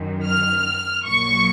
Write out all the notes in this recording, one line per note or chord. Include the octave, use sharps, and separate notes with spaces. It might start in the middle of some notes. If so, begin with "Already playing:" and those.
Already playing: F#2 D#3 F#3
F6
A#1 A#2 F#3 C#6